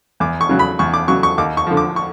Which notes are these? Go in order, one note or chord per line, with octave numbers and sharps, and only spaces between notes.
E2 D6
C#6
C#3 F#3
B5
E2 C#6
D6
C#3 F#3 C#6
C#6
D#2 D6
C#6
D3 F3
D6
C#6